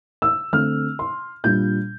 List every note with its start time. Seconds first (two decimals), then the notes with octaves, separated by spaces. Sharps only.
0.22 E6
0.53 D3 A3 C4 F6
0.99 C6
1.44 A#2 G3 D4 G6